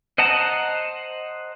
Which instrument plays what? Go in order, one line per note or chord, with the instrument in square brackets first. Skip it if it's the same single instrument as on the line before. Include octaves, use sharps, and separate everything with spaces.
[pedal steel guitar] C5 D#5 F#5 A5 A#5